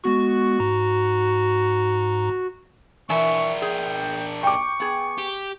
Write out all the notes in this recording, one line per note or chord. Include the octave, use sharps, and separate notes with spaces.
G#3 B3 F#4 C#6
G#2 A#5
E3 D4 A#4 E5 G#5 C#6
G#4 G5
G5 C#6 D6
B3 G#4
G4